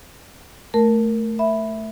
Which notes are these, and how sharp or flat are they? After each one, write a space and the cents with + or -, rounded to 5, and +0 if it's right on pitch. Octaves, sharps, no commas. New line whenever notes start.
A3 +0 A#4 +0 A5 +0
E5 +0 B5 +0